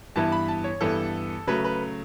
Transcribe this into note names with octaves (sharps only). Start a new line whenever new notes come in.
G2 E3 B3 E4 A5
B5
A5
C#5
G2 E3 B3 E4 A4
C#3 F#3 A3 B4
B4